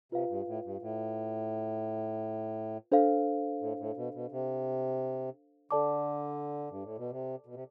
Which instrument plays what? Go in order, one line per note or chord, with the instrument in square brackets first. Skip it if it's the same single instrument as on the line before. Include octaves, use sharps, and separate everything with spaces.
[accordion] C3 [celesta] F4 B4 F5
[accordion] G2
A2
G2
A2
[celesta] D4 A4 C5 F5
[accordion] A2
A2
B2
B2
C3
[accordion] D3 [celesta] A4 D5 A5 D6
[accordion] G2
A2
B2
C3
B2
C3